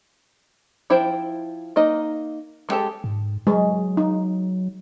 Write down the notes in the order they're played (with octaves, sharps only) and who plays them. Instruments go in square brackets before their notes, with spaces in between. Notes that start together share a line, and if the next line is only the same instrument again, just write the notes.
[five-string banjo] F3 E4 C5 G5
A#3 D#4 D#5
F3 G#3 G4 A4 A5
[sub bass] G#2
[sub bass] F#3 [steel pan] G#3
[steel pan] D#4